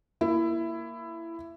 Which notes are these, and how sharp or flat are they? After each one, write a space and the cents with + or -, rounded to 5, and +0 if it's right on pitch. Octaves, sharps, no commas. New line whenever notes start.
A#3 +0 E4 +15